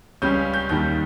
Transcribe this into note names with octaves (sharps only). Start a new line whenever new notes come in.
C#2 C#3 G3 C#4 G6
G6
D#2 D#3 G3 G6